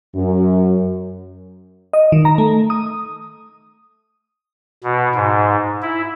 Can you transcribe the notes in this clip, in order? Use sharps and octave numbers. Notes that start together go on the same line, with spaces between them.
F#2
D#5
D#3
A#5
A3
D#6
B2
G#2
E4